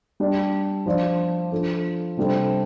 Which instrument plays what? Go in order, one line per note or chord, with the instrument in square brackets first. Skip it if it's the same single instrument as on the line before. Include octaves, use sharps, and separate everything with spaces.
[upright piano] G3 D4 G4 D5
F3 D4 F4 D5
F3 D4 F4 A4
C3 G3 D4 A4 C5